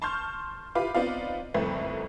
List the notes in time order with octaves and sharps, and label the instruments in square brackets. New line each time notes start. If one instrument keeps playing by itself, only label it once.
[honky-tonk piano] A5 C6 C#6 F6 G6
E4 F4 G4 B4 F5 D6
B3 C4 D#4 F4 D5 F5
F#1 C2 F2 A3 C4 B4